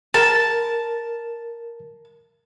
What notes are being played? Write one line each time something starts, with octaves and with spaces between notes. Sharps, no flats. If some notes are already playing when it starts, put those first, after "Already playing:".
A#4 A5